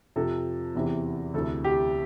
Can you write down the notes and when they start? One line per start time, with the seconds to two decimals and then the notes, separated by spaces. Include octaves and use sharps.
0.16 F2 C3 F3 A4
0.75 E2 C3 E3
1.34 D2 C3 E3 A4
1.64 G4